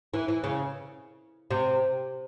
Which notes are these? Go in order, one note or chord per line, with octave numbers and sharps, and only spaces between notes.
E3
E3
C#3
C3